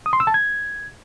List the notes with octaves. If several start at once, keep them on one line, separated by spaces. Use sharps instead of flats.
D#6
C6
E6
A5
G#6